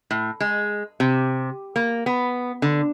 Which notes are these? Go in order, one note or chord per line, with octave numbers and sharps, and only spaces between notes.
A2
G#3
C3
A#3
B3
D3